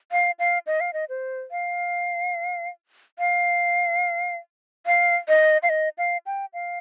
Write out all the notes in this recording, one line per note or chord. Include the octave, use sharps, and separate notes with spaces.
F5
F5
D#5
F5
D#5
C5
F5
F5
F5
D#5
F5
D#5
F5
G5
F5